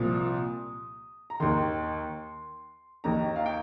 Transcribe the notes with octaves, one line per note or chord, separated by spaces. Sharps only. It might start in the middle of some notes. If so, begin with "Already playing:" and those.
Already playing: C2 A#2 F3 D#6
A#5
D#2 D#3 C6
D#2 D#3 A#5
F5
G5